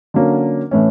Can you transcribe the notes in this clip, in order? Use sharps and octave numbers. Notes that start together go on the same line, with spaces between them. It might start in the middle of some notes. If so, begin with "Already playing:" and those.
D3 F#3 A#3 C#4
A2 E3 A3 C#4